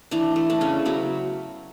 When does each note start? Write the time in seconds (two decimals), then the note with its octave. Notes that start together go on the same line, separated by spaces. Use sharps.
0.11 E3 D4
0.36 A3
0.50 D4
0.61 C#3 C#4
0.85 F#3 B3